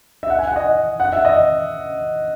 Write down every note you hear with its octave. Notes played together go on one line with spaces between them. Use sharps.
E5
F#5
G#5
F#5
D#5
F#5
E5
D#5